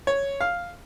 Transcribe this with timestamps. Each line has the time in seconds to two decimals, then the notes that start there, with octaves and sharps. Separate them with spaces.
0.07 C#5
0.41 F5